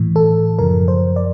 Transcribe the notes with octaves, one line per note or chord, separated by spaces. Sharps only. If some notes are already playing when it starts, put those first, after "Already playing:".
Already playing: A2 E3
A4
F#2 C#3 F3 A#4
C5
D5